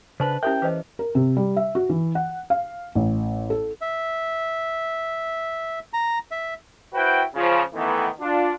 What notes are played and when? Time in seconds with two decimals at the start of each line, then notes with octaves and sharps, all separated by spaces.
0.20 C#3 D4 B4 C5 A5
0.43 C#4 E4 G4 A#4 E5 G5
0.62 E3 B4 C5 D#5
0.99 A#4
1.15 C3
1.37 G3
1.57 E5
1.75 F#4
1.89 E3
2.15 F#5
2.50 F5
2.95 A1
3.50 A4
3.81 E5
5.93 A#5
6.31 E5
6.93 E4 F#4 B4 C5 F#5 G5
7.35 C#3 F3
7.73 D#3 E3 A3 B3
8.20 D4 F4